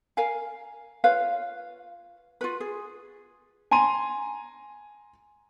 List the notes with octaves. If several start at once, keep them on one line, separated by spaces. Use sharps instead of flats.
A#4 F5 G#5
F4 B4 C#5 F5
F4 F#4 B4
G#4
G#5 A#5 C6 D#7